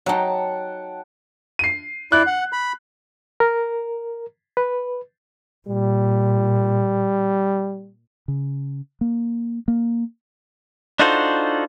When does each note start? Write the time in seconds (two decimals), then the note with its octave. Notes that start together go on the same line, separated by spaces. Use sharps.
0.06 F#3 D#4 F#5 G5 A5
1.59 C7 D#7
2.12 E4 D5 F#6
2.27 F#5
2.53 B5
3.40 A#4
4.57 B4
5.69 A#2 G3
8.28 C#3
9.01 A#3
9.68 A#3
11.00 D4 D#4 F4 F#4 A4 C5